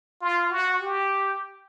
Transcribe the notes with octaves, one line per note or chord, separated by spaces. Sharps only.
F4
F#4
G4